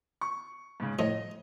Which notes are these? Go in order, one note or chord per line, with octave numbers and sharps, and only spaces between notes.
C#6
G#2 C#3
A2 F3 D#5